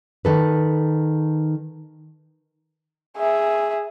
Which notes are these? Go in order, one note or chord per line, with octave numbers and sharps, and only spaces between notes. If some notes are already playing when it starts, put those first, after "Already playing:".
D#3 A4 B4
G#4 E5